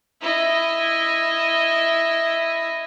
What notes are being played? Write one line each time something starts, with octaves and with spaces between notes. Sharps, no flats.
E4 D#5